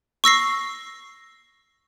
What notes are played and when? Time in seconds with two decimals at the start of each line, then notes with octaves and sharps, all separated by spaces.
0.24 C#6 E6 A#6 C7